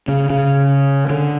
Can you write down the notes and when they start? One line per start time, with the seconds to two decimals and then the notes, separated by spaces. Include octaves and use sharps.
0.08 C#3
0.30 C#3
1.10 D3